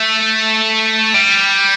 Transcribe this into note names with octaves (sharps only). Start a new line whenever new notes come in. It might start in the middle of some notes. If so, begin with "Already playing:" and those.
Already playing: A3
G3